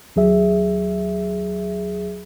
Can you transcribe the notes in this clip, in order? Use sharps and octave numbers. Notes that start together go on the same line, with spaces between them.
D#2 F#3 G#4 E5